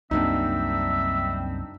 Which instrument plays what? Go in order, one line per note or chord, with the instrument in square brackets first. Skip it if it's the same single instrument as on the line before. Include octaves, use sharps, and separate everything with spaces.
[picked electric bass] C2 F#2 A#3 [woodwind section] G3 C4 [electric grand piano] D4 D#4 [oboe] E5